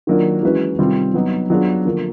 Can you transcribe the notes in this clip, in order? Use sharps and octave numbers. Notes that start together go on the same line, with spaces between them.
D#3 F#3 A#3 D4 F4
E3 G#3 C#4 F#4 B4
C3 D#3 G3 C4 F4
F#3 B3 D#4
F#3 B3 D4 F4 G#4
D3 F3 A#3